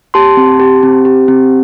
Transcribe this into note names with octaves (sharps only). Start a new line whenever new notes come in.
G4 A5 C6
C4
G4
C4
G4
C4